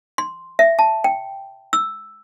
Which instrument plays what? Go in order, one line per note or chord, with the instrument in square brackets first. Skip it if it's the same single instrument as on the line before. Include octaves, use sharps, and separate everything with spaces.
[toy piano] C6
E5
A5
G5
E6